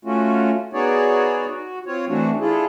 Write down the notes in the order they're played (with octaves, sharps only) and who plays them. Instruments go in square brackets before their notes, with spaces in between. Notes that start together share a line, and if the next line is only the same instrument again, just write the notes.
[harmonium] A3 C#4 F4 F#4
B3 D#4 F#4 G#4 C#5 D5
F#4
C4 F4 C#5
E3 A3 C4 D4 F#4
D4 E4 F4 G#4 A4